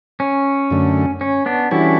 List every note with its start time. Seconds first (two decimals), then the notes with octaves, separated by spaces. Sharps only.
0.20 C#4
0.71 F#2 D3 A3
1.21 C#4
1.46 B3 D4
1.71 E3 G3 C#4 D4 E4 F#4 A4